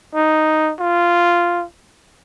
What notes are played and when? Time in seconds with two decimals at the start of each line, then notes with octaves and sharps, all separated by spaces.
0.15 D#4
0.79 F4